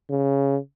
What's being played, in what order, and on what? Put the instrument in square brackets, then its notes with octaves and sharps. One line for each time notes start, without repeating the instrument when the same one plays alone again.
[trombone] C#3